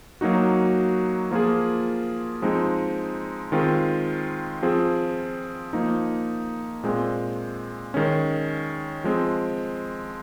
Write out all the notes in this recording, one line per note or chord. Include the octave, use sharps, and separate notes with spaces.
F#3 A#3 D#4 F#4
F3 A#3 F4 G#4
F3 G#3 C4 D#4
D#3 G#3 C4 F4
F3 C4 F4 G#4
F3 A#3 D#4
A#2 G#3 C4
D#3 G#3 C#4
F3 G#3 C4